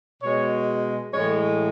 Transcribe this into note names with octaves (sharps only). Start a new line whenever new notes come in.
B2 G#3 C#5
A2 E3 G#3 C#5